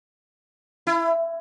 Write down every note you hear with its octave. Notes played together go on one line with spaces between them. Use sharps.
E4